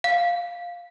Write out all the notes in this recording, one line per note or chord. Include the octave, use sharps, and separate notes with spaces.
F5